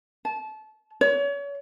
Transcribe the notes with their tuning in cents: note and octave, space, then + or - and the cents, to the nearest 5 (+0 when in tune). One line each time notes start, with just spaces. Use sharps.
A5 -25
C#5 +35